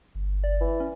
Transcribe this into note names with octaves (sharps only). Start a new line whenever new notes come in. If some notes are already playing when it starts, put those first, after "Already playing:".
G1
D5
E3
C#4